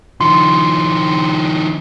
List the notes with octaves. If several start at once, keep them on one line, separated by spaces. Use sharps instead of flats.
D#3 F3 C6